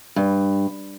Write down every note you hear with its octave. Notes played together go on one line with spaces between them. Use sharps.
G2